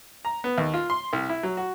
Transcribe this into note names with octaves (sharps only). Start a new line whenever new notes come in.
A#5
B3
D#2
F4
C6
C2
E4
F#3
F#4